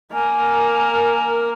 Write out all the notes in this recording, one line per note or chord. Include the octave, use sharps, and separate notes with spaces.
A#3 A#4 G#5